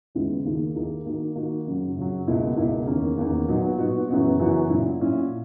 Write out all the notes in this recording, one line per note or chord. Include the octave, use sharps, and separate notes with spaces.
D#2 C#3 G#3 B3 E4
D#2 D#3 A#3 E4 G#4
D#2 D#3 A#3 E4 G#4
D#3 A#3 D#4 F#4
D#3 A#3 D#4 F#4
F#2 C#3 F#3
F#2 C#3 F#3
C#2 B2 A#3 E4
C#2 B2 A#3 E4
E2 D#3 A#3 C#4
E2 D#3 A#3 C#4
A#2 F#3 B3 D#4 F#4
A#2 F#3 B3 D#4 F#4
F#2 C#3 E3 B3 F#4
F#2 C#3 E3 B3 F#4
A#2 F#3 C#4 E4
A#2 F#3 C#4 E4